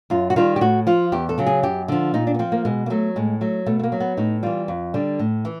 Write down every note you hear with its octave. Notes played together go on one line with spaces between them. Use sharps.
F#2 F4
F#4
D#3 G3 F4
G4
A2 F#4
F3 F4
E2 G4
A4
C#3 F#3
G#4
F#2 G4
D3 F3
A#2 D#4
D4
B3
F3 C4
A#3
B2 G#3
A#3
F#3 A3
A2 G#3
F#3 A3
B2 A3
A3
A#3
F#3
B3
A2 D#4
E3 G3 F4
F2
D3 G3
A2
E3